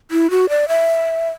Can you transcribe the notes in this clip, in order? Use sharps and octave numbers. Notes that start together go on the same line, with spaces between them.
E4
F#4
D5
E5